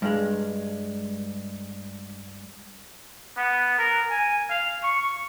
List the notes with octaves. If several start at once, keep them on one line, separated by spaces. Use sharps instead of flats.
G2 G#3
B3
A#4
G#5
F5
C#6